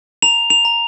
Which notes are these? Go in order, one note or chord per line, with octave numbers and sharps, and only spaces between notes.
A#5 F7
F7
A#5